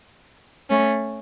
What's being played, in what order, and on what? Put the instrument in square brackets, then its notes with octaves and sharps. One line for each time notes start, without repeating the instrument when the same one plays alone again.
[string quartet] A3 C#4